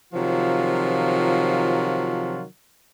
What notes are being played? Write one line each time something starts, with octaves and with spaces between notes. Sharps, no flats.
C3 D#3 F3 F#3 F4